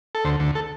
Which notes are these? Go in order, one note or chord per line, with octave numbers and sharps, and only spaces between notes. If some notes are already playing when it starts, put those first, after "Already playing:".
A4
D2 C5
D2
A4